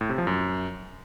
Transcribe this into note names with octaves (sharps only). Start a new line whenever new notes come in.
A2
C3
F3
F#2